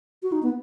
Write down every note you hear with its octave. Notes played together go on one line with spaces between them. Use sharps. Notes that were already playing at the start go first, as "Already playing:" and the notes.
F#4
D#4
B3